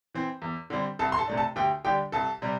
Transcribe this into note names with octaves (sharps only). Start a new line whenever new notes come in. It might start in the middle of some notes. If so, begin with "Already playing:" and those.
E3 C4
E2
D3 G3 C4
C2 A4 A5
C6
A4 A5
C3 A3 D4
A4 A5
D2 G4 G5
D3 G3 D4 G4 G5
C2 A4 A5
C3 G3